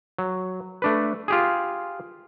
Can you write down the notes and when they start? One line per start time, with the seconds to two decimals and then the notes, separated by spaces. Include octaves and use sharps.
0.18 F#3
0.82 A3 D4 B4
1.28 F4 G4 G#4